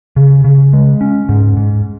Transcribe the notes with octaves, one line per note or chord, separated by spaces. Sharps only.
C#3
C#3
G#3
C#4
G#2
G#2